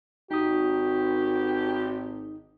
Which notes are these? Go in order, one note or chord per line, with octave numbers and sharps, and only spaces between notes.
G#1 D#4 F#4 G4 D#6